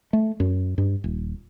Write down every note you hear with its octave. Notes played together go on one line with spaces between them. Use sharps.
A3
F#2
G2
D#1